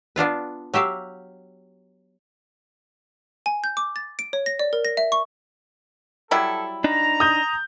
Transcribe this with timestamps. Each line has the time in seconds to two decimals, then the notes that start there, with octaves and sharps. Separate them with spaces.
0.16 B3 D4 F4 B4
0.74 F#3 G4 E5 F5
3.46 G#5
3.64 G6
3.77 D6
3.96 A6
4.19 D7
4.33 C#5
4.46 A#6
4.59 D5
4.73 A#4
4.85 A#6
4.97 E5
5.12 C#6
6.31 F#3 G3 E4 A4
6.84 D4 D#4 A#5
7.20 D#6 G6